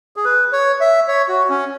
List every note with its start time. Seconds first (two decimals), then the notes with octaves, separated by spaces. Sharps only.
0.16 G#4
0.25 B4
0.52 C#5
0.81 E5
1.08 C#5
1.28 F#4
1.50 C#4